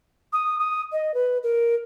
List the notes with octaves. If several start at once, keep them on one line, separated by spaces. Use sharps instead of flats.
D#6
D#6
D#5
B4
A#4